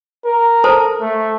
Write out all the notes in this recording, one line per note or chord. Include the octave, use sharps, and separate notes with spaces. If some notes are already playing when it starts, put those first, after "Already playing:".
A#4
A4 C5 A5
A3